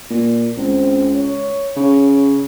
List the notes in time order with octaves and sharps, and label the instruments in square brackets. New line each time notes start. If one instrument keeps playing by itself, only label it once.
[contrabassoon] A#2
[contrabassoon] C#2 [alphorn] C4
[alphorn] C#5
[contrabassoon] C#3